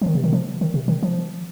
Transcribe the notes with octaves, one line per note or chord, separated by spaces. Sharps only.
F3
D#3
C3
D#3
F3
D#3
C3
D#3
F3